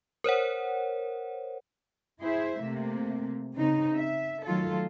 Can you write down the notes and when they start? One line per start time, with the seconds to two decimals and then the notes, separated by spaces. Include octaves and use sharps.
0.24 A#4 C5 C#5 F#5
2.21 E4 G#4 C5 E5
2.60 C3 A3 A#3
3.54 C#3 C4 D#4
3.95 E5
4.45 D#3 F#3 A3 F4 A4